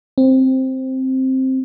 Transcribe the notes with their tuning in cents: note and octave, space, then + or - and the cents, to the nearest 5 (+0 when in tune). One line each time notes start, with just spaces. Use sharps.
C4 +5